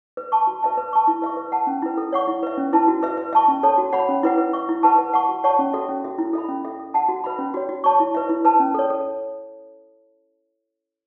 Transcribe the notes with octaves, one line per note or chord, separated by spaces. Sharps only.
B4
A5 C#6
F#4
B4 E5 A5
B4
A5 C#6
E4
B4 E5 C#6
B4
F#5 A5
C#4
E4 B4
A4
C#5 F#5 C#6
E4
B4 E5
C#4
E4 B4 A5
F#4
B4 E5
B4
E5 A5 C#6
C#4
A4 C#5 A5
F#4
C#5 F#5 B5
C#4
E4 B4 F#5
B4
E5 C#6
E4
B4 F#5 A5 C#6
B4
F#5 A5 C#6
F#4
C#5 F#5 A5 C#6
C#4
F#4 A4 E5
C#4
F#4 A4 E5
E4
A4 E5 B5
C#4
A4 E5
A4
F#5 A5
F#4
B4 E5 B5
C#4
F#4 C#5
F#4
C#5 A5 C#6
E4
B4 E5
E4
B4 A5
C#4
A4 C#5
A4